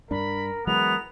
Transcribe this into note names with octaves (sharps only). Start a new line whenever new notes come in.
G2 D4 A#4 B5
E3 F#3 G#3 B3 A#4 F7